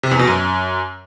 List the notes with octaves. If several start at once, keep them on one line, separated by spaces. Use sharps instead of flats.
C3
E2
B2
F#2